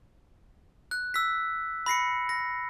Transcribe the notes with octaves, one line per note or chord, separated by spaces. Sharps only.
F#6
E6 B6
B5 A#6 C7 C#7
A#6